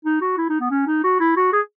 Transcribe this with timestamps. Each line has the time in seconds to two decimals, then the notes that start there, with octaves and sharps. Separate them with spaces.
0.05 D#4
0.21 F#4
0.38 E4
0.49 D#4
0.60 B3
0.70 C#4
0.87 D#4
1.04 F#4
1.20 E4
1.36 F#4
1.53 G#4